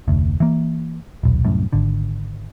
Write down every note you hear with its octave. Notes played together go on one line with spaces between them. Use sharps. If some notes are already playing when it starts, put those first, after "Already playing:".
F1 D2
E3 A#3
D#1 B1
C2 F#2 A2
G#1 D3